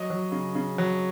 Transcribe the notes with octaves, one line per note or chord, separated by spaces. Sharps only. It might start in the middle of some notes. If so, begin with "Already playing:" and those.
Already playing: F#3 D#5
F#3
C#3
C#3
F#3